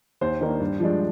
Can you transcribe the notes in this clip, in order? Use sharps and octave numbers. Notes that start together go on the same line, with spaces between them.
D#2 C5
D#3 A#3 D4
G2
F3 G#3 D4